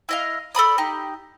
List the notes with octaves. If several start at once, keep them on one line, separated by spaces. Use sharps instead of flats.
E4 D#5 F5
A4 D5 B5 D#6
D#4 G4